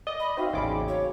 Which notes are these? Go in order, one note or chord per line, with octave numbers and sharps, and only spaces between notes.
D5 D#5
B5
C4 D#4 F#4 C5 D5 E5 F5
A1 E2 C#3 B5 D6
A#3 C#4
C#5